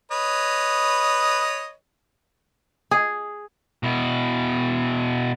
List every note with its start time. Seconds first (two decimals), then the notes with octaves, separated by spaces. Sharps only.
0.12 B4 C#5 D#5
2.91 G#4
3.83 B2 E4